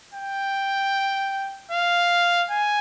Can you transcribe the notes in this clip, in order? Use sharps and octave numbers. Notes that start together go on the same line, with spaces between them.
G5
F5
G#5